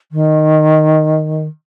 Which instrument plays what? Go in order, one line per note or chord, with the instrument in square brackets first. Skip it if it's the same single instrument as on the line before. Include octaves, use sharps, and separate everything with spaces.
[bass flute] D#3